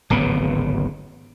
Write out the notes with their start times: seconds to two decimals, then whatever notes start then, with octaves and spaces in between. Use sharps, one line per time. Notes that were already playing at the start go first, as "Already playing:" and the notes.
0.10 D1 G#1 C#3 B3